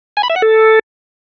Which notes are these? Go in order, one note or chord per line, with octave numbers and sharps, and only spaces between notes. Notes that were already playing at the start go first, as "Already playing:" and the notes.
G#5
B5
E5
F#5
A4